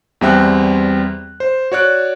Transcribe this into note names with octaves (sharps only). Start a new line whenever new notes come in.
E2 G3 C4 E5 G5 F#6
C5
F#4 C#5 D5 F#6